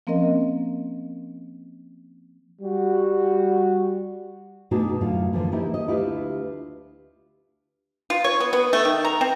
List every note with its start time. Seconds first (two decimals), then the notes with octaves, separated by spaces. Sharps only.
0.07 F3 A#3 C4 C#4 A#4 D#5
2.62 G3 F#4
4.71 B2 A3 D4 D#4 F#4 G#4
5.01 F#2 A2 D3 F4 F5
5.33 D3 E3 F3 A#3
5.52 A#3 D#4 E4 G4
5.74 D#5
5.87 D2 E4 F4 G4 A#4 B4
8.10 F4
8.24 C#5
8.40 B3
8.53 B3
8.73 A3
8.85 D#3
9.05 A#5
9.21 C4